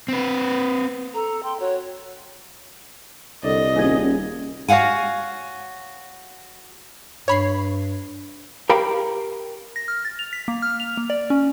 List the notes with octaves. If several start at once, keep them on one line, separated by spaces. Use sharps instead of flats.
C4 B4
A4 A#5
G5 C6
F#4 C#5
C2 D3 D5 D#5
D#1 C#4 G#4 G#6
F#4 C#5 F5 F#5 G#5
G2 C#5 B5 C7
G4 A#4 F5 G5 B5
A#6
F6
A6
F7
B6
A#3
F6
F7
A#3
D5
C#4